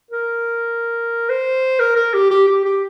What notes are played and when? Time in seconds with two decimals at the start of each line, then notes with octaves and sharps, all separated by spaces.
0.11 A#4
1.29 C5
1.79 A#4
1.96 A#4
2.14 G4
2.31 G4
2.47 G4
2.65 G4